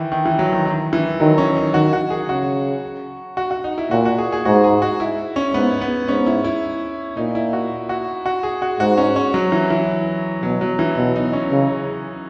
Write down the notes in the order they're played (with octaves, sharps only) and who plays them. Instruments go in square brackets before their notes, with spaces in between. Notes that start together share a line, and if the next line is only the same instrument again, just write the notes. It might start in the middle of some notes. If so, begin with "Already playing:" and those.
Already playing: [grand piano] D#3 E3
D#3
E3
F#3
D#3
D#3
E3
[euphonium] D#3 [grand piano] F#3
[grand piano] C#4
D#4
[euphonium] D#3 [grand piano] F#4
[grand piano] F#4
G#4
[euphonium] C#3 [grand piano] F#4
[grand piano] F#4
F#4
D#4
E4
[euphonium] A#2 [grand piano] F#4
[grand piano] F#4
G#4
G#4
[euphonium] G#2 [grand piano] F#4
[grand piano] G#4
F#4
E4
C#4
[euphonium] G#2 [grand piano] B3
[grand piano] B3
[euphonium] G#2 [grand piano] C#4
[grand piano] E4
E4
[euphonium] A#2 [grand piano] D#4
[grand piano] E4
F#4
F#4
F#4
G#4
F#4
[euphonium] G#2 [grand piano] F#4
[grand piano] C#4
C#4
F#3
E3
E3
[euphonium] B2 [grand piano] F#3
[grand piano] F#3
E3
[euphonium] B2
[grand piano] D#4
C#4
[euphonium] C#3